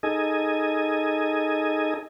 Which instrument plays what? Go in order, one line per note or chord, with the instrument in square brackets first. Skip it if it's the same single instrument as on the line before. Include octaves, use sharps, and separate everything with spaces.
[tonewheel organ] D#4 G#4 A4 D#5 G#5